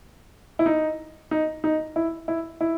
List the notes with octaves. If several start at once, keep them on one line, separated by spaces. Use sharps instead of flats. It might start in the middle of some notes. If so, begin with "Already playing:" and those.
E4
D#4
D#4
D#4
E4
E4
E4